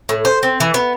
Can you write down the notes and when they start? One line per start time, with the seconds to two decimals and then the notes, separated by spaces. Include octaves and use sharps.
0.09 A2
0.25 C5
0.43 C4
0.60 E3
0.74 B3